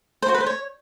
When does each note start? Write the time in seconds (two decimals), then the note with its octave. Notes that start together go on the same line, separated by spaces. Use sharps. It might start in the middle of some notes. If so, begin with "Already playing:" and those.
0.22 C5
0.28 F#4
0.34 B4
0.40 C5
0.46 C#5